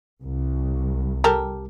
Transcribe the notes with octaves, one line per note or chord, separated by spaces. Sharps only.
C2
G4 A4 A#4